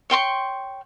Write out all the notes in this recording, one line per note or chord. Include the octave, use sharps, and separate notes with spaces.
C#5 G5 C6 C#6